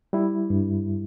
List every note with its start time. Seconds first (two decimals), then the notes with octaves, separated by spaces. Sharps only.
0.13 G3 E4
0.50 G2